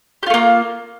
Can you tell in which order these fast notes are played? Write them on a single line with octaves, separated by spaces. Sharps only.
G4 F4 A3 A#3